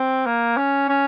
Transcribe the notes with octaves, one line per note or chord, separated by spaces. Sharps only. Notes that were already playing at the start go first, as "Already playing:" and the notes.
Already playing: C4
A#3
C#4
C#4